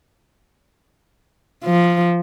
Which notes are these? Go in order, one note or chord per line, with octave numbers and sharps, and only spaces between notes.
F3